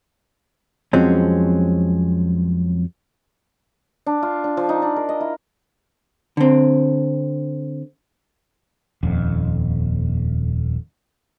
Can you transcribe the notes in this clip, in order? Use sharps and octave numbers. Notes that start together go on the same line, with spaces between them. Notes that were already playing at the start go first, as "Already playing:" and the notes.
F2 F3 F#3 G#3 C4 C#4
D4
F4
D4
F3
D#4
D4
A#4
D#5
E4
D3 C4
D#1 F2